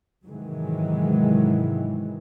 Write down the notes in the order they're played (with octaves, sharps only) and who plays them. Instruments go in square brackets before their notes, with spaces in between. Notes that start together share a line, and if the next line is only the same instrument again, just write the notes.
[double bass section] G#2 C3 D#3 E3 F#3 G#3